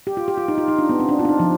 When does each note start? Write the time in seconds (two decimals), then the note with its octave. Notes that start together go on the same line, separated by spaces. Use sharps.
0.07 G4
0.17 F4
0.28 G4
0.38 F4
0.48 D#4
0.58 F4
0.68 D#4
0.79 D4
0.89 B3
1.00 C4
1.09 D4
1.19 F4
1.25 D4
1.29 D#4
1.40 F3